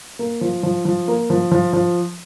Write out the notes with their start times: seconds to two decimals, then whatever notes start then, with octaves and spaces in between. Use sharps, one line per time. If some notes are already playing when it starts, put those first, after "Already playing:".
0.19 A#3
0.41 F3
0.63 F3
0.85 F3
1.08 A#3
1.30 F3
1.52 F3
1.73 F3